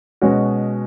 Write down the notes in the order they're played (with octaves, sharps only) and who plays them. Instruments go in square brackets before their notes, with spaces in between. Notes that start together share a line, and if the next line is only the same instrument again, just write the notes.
[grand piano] B2 G#3 C#4 F#4